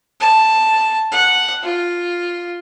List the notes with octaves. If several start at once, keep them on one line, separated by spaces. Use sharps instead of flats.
A5
F#5
F4